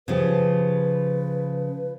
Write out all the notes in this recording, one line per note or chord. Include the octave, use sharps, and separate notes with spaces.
C#3 F3 G4 B4